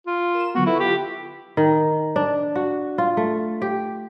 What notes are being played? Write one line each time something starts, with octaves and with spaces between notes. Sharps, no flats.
F4
A#4 E7
D3 F#3 B3 F#4
E4 F4 A4 B4
G4
D#3
D4
F#4
F4
A3
G4